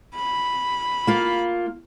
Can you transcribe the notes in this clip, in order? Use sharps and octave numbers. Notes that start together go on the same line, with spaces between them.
B5
A#3 F4